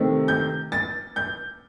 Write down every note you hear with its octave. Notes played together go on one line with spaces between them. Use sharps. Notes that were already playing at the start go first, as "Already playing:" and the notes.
Already playing: C3 D#3 A3 C4
G6
A6
G6